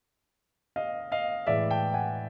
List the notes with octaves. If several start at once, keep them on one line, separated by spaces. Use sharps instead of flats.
D#5 F5
D#5 F5
A2 E3 G#3 D5 E5
G5 A5
F#5 G#5